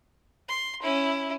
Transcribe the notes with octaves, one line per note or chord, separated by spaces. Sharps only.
C6
C#4 E4